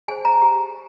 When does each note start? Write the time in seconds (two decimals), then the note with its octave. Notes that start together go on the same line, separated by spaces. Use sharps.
0.08 G#4 G#5
0.11 C5
0.25 A#5
0.42 G4